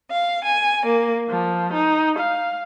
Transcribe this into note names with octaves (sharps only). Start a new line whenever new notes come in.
F5
G#5
A#3
F3
D#4
F5